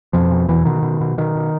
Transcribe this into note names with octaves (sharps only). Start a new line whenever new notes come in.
F2 B2 F3
B2
E2 B2 E3
B2 D#3
B2
B2
B2 D#3
B2